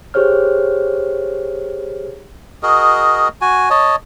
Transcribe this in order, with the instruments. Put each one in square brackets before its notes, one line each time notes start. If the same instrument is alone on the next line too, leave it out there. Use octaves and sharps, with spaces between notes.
[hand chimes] G4 G#4 C5 C#5 F6
[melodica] F#4 G#4 A#4 D#5
F#4 G#5
C#5 D#5 A5